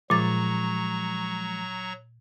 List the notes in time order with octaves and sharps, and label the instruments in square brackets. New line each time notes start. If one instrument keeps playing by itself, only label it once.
[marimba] A#2 A6 [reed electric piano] F3 G#3 [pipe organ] F#3 A#5 C#6